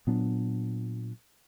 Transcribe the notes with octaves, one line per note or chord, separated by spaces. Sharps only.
A#2 F#3 B3 D4